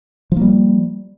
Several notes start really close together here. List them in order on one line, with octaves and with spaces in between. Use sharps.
F3 A#3 G3